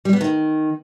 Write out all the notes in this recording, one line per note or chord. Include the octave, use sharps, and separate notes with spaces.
G3
B3
D#3